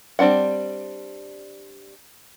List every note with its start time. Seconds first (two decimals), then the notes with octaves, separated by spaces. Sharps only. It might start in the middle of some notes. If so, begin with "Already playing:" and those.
0.19 G3 C4 D4 E4 F#5